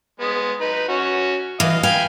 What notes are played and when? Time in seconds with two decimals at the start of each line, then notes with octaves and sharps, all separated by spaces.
0.20 G#3 B3
0.61 D#4 B4
0.88 C#4 F#4
1.60 E3 D#5 F5
1.83 F5 G5 G#5 B5